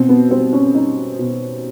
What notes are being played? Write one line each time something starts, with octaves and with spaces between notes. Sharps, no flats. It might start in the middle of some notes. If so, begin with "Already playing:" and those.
Already playing: B2 C4
B3
G3 C4
C#4
G3 D#4
B2